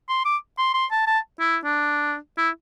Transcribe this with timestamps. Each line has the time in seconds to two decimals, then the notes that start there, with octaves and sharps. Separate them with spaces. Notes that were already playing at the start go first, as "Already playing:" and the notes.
0.09 C6
0.25 D6
0.58 C6
0.74 C6
0.91 A5
1.07 A5
1.40 E4
1.64 D4
2.38 E4